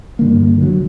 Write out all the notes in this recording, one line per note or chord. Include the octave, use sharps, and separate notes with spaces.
G2 D3 A#3
C2 D3 D#3 F#3